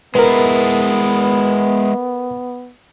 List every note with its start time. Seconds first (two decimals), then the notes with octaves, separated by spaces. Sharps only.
0.15 G#3 B3 E4 A#4 B4